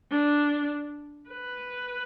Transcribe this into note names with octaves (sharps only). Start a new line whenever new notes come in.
D4
B4